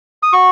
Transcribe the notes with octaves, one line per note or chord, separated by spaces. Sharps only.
D#6
F#4 C#6